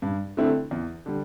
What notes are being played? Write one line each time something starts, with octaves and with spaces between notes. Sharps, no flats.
G2
D3 A3 C4 E4
E2
D3 G3